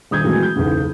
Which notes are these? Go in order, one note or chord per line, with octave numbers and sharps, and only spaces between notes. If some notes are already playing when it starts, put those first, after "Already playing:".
D#1 D#6 G6 G#6
A#2 E3 F#3 G#3 A3 C4
G6
F#1 B1 E2 C#3